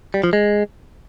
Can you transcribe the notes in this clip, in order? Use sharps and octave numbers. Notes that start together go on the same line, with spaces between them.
G3
F3
G#3